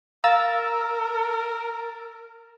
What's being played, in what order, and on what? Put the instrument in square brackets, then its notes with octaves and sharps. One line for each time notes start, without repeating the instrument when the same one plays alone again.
[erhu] A#4 [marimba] F5 [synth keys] A#5 E6 A6